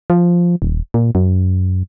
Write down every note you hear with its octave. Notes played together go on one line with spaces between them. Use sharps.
F3
D#1
A#2
F#2